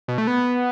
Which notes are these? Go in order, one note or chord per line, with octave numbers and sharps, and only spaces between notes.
B2
A3
B3